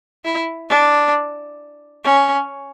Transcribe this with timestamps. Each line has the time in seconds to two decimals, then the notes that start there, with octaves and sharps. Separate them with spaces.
0.25 E4
0.70 D4
2.04 C#4